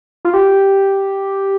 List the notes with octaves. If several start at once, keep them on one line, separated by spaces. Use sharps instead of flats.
F4
G4